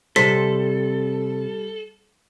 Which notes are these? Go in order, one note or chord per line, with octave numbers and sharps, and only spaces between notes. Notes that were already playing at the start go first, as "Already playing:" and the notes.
C3 G3 A4 C5 B6